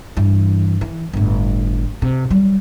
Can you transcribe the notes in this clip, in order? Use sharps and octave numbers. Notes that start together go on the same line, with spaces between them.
G2 E3
E3
G1 A2
C3
F#3 G3